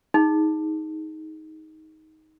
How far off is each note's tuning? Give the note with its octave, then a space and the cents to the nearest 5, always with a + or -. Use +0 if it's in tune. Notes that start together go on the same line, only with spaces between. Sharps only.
D#4 +15 G#4 +0